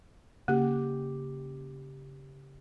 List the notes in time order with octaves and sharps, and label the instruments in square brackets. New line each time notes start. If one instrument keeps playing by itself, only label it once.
[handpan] C#3 G4 [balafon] A#3